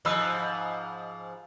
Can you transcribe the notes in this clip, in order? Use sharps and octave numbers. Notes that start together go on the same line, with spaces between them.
G#2 F3 D#5 B5 E6